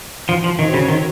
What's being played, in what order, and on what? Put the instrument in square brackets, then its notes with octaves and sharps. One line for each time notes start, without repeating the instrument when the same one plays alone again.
[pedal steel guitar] F3
F3
[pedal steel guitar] D#3 [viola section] F#3 C4 F#4 C#5
[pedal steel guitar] C#3
D#3